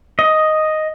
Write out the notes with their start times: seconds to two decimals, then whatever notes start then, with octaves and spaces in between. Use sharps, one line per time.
0.19 D#5